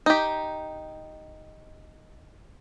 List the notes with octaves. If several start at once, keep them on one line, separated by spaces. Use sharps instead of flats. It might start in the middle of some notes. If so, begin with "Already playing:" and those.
D#4 G4